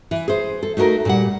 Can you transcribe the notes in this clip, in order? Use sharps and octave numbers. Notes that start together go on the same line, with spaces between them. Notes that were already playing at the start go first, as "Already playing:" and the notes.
E3
G#4 C5
A4
A3 D#4 F#4 G#4 A#4
A#2 G3 F#5